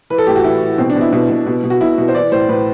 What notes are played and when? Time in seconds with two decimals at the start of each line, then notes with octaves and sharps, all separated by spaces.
0.10 E3 B4
0.18 A4
0.27 A2 G4
0.36 F#4
0.44 E3 E4
0.61 E3
0.78 B2 C4
0.90 D4
0.96 B2
1.01 E4
1.13 B2
1.30 B2
1.46 B2
1.63 B2
1.70 F#4
1.81 B2 E4
1.98 B2
2.08 C5
2.15 E3 D5
2.31 A2 C5
2.49 A2 B4